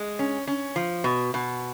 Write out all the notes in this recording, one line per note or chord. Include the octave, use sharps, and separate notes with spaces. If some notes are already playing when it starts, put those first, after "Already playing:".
Already playing: G#3
C#4
C#4
F3
B2
B2